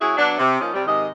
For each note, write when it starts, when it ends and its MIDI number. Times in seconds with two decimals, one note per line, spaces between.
0.01 0.14 56
0.01 0.14 61
0.01 0.14 64
0.01 0.14 66
0.01 0.14 68
0.17 0.34 54
0.17 0.34 59
0.17 0.34 62
0.38 0.60 48
0.60 0.71 53
0.60 0.71 58
0.60 0.71 61
0.60 0.71 63
0.74 0.82 48
0.74 0.82 55
0.87 1.08 44
0.87 1.08 48
0.87 1.08 51
0.87 1.08 75